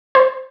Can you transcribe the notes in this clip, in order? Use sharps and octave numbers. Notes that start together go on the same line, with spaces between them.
C5